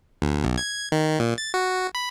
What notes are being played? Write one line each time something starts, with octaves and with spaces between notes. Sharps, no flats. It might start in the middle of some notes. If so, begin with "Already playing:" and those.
D2
B1
G#6
D#3
A#2
A6
F#4
B5